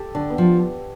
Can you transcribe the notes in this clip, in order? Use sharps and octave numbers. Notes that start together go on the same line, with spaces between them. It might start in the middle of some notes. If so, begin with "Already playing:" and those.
Already playing: G4 A4
D3 D4
B3
F3